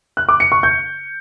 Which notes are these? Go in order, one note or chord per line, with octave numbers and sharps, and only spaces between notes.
F#6
D6
C#7
C#6
G6